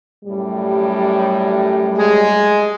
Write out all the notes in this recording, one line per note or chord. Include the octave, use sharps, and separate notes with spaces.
F#2 A2 G3
G#3 G#4